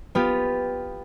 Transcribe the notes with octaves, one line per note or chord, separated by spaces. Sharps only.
B3 F4 G4